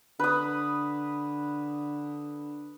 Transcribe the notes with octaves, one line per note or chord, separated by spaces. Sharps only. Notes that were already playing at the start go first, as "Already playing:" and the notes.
D3 B4 D#6